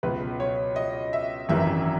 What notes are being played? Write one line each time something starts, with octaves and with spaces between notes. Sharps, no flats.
C#2 B2 F#3 B4
C#5
D#5
E5
G#1 F#2 E3 E5